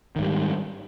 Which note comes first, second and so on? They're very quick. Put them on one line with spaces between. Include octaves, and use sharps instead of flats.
D#3 G#2 G3